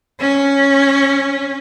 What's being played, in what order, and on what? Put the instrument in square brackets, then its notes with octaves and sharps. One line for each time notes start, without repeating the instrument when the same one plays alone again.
[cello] C#4